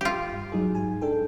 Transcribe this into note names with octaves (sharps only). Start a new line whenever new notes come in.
F4 G4
G2
F#3 D#4 G#4
G#2 G#5
D4 A4 G5